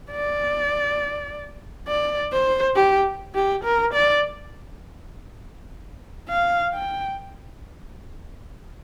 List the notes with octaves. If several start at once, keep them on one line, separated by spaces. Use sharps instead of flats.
D5
D5
C5
G4
G4
A#4
D5
F5
G5